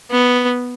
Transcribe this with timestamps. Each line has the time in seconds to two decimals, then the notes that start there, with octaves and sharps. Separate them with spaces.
0.11 B3